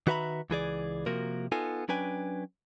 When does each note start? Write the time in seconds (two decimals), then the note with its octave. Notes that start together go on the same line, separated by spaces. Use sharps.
0.07 D#3 F#4 B4 E5 A#5 B5
0.50 C#2 E3 G#4 D5
1.06 C3 F3 A#3 F#4 A#4
1.52 B3 D#4 F4 A4 G#5
1.88 F#3 C#4 D4 B4 G5 G#5